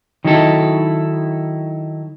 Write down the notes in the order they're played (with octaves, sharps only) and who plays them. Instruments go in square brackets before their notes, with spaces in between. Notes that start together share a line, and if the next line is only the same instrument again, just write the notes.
[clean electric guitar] D#3 F#3 D#4 E4 A4